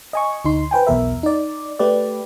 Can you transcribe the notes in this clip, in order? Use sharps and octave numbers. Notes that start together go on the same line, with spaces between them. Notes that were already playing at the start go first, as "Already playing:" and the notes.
D#5 G#5 C#6
D2 D#4 C6
B4 C5 G5 G#5
B1 E2 B2 A#4 E5
D#4 D5
A3 G4 B4 D5